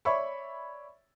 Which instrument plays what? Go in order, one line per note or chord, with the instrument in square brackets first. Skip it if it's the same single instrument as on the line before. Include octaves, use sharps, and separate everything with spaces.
[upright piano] C#5 D5 E5 B5 C#6